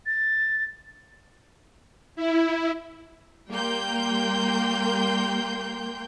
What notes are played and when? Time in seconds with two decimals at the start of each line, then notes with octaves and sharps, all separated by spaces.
0.06 A6
2.16 E4
3.51 G3 A#3 A#4 G5 C6 G6